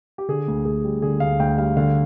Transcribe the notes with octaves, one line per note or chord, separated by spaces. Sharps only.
G4
D3 G#4
D2
D2 G#4
G3
D3 G#4
D2 F5
D2 G5
G3 F5
D3 F5